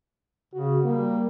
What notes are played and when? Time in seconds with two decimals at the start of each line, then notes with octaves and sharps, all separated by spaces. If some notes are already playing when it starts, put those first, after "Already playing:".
0.54 C#3 F#4
0.84 G3 A#3